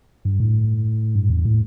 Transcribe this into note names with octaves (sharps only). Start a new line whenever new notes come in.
G2
A2
G2
E2
A2